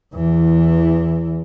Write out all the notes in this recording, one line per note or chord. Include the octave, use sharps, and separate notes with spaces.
E2 E3